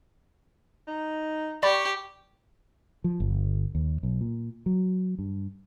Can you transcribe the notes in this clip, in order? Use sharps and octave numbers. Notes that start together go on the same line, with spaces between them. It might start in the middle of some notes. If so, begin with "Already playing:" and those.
D#4
G4 D5 B5 C#6
F3
G1
D#2
B1
A#2
F#3
G2